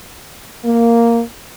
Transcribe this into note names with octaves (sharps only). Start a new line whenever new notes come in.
A#3